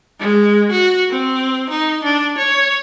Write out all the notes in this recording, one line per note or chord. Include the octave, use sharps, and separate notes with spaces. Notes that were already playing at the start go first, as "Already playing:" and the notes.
G#3
F#4
C4
D#4
D4
C#5